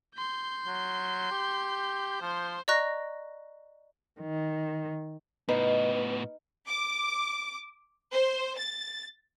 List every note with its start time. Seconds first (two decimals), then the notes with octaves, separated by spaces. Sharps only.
0.15 C6 G6
0.67 F#3
1.31 G4
2.22 F3 C5 C6
2.68 D5 D#5 A#5 C#6 F#6 A#6
4.21 D#3
5.49 A2 B3 D#4 B4
6.67 D6
8.12 C5
8.57 A6